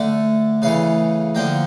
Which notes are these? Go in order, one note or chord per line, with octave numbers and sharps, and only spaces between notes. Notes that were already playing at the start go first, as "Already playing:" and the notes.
Already playing: D3 A3
C#3 E3 A3 F5
D3 F3 A#3 G5